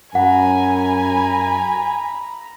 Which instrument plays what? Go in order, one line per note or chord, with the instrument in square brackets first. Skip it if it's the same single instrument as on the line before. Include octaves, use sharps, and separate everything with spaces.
[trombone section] F#2 [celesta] F#5 [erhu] G#5 [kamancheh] A#5 B5